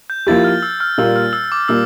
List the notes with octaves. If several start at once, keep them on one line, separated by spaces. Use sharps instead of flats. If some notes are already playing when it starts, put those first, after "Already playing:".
G6
F3 A#3 E4 G4 A6
F6
E6
F6
A#2 G3 A#3 F4 E6
F6
E6
D6
A#2 G3 A#3 F4 E6